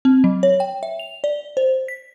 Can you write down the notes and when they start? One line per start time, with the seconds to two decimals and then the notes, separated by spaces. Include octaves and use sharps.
0.05 C4
0.24 F#3
0.43 C#5
0.60 G5
0.83 E5
0.99 F7
1.24 D5
1.57 C5
1.88 B6